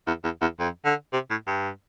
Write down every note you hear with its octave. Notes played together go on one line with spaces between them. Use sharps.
E2
E2
E2
F2
D3
C3
A2
G2